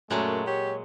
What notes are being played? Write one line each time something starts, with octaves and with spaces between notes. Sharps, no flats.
F#2 A#2 F#3 G#3 A3
G4 C#5